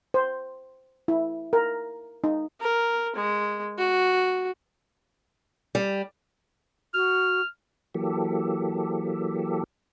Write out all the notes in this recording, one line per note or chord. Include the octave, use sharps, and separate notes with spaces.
C5
E4
A#4
D#4
A#4
G#3
F#4
G3
F#4 F6
E3 F#3 A#3 G4 A4